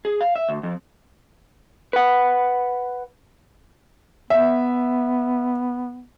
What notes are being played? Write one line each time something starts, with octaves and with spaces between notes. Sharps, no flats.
G#4
F5
E5
D2
F2
B4 F#5
B3 E5